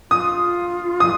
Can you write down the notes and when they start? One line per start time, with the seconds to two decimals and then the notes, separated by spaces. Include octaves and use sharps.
0.11 F4 D#6
1.00 D#6